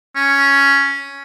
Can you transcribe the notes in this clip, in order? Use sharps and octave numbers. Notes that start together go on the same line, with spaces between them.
C#4